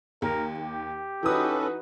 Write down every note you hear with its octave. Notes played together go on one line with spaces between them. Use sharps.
D#2 A#4
G4
E3 C#4 D#4 F#4 A4 B4 D#6